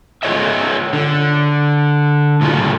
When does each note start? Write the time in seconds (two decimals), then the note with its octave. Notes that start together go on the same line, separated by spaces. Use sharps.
0.23 F4 F#4 G#4 C#5 D#5 E5
0.93 D3
2.41 A2 C#3 F#3 F4